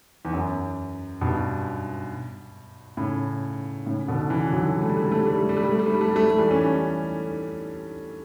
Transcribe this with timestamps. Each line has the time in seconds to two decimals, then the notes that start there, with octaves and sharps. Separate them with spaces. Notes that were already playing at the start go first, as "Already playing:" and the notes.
0.25 E2
0.33 F#2
1.21 G2 B2
2.97 A2 C#3
3.86 A2 C#3
4.08 B2 D3
4.30 C#3 E3
4.52 D3 F#3
4.74 G3
4.82 A3
4.89 G3
4.97 A3
5.05 G3
5.12 A3
5.19 G3
5.26 A3
5.34 G3
5.41 A3
5.49 G3
5.57 A3
5.63 G3
5.71 A3
5.79 G3
5.86 A3
5.93 G3
6.01 A3
6.08 G3
6.16 A3
6.23 G3
6.30 A3
6.38 E3 G3
6.51 A3 C#4